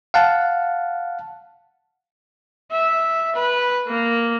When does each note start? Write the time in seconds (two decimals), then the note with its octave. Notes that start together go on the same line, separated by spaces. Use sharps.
0.14 F5 F#5 A5
2.72 E5
3.35 B4
3.87 A#3